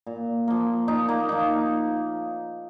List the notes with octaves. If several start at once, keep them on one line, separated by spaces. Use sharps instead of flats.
A#2
F3 A#3
A#2 D#4
A#3
F3 A#3 D#4